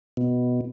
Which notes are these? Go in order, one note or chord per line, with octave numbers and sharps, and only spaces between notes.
B2